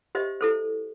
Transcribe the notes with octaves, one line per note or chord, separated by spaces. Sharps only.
G4 C5 D#5 E5
E4 A4 C5